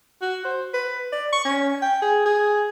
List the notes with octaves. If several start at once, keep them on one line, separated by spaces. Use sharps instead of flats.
F#4
C5
B4
D5
C#6
C#4
G5
G#4
G#4